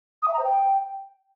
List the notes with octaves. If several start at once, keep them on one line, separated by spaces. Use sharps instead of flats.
D#6
E5
A#5
C5
G5